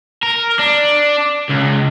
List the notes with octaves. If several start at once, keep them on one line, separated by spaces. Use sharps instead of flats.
A#4
D4
C#2